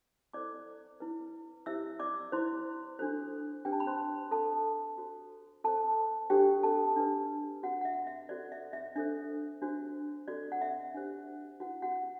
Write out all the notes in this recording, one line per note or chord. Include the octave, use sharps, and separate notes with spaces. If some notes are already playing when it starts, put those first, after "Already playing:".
E4 A4 C5 D5 D6
E4 B4
E4 G4 C5 E5 E6
D5 D6
E4 B4 C5 C6
D4 F#4 A4 C5
D4 G4 B4 G5
A5
B5
C5 C6
F#4 A4 B4 A5
F#4 A4 C5
F#4 A4 C5 A5
D4 F#4 G4 A4 C5 G5
A4 A5
D4 G4 B4
F#4 B4 F#5
F#5
E5
E5
F#4 A4 C5 D5
E5
E5
D4 A4 C5 E5
D4 F#4 C5
F#4 A4 C5 D5
F#5
E5
D4 G4 C5
E4 F#4 B4 F#5
F#4 F#5